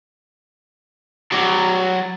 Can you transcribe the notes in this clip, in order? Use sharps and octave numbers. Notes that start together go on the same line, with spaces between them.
F#3 D5